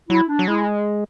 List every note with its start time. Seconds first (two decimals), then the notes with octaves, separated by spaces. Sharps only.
0.10 F#3 E4
0.29 D4
0.39 F#3
0.48 G#3 E4